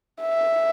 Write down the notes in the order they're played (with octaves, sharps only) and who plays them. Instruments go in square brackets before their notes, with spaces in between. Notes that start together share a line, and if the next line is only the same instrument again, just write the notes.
[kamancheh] E5